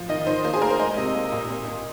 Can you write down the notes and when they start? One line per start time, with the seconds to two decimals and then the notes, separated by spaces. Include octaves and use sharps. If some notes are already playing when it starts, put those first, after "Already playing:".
Already playing: F3
0.09 D#3 D#5
0.27 D#3 C5
0.44 A#3 C5
0.53 G#4
0.61 A#3 A#4
0.70 C5
0.79 G#3 D#5
0.97 C3 D#5
1.15 A#3
1.32 A#2
1.50 A#2
1.68 A#2